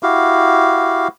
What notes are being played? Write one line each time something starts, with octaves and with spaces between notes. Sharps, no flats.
E4 F#4 G4 F5